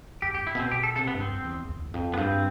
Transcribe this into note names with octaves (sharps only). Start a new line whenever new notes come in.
F2 G4
G4
A2
E4
B2 C4
B2 G4
A4
C3 A4
B3
G2
F2 C4
E2
E2
E2
F2
B3
G2 C4